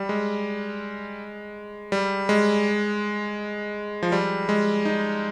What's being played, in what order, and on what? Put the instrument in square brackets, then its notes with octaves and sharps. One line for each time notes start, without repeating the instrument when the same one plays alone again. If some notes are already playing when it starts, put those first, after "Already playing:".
Already playing: [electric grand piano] G3
G#3
G3
G#3
F3
G3
G#3
D#4